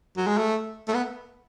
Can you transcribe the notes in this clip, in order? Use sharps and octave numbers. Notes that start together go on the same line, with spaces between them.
F#3
G#3
A3
A3
B3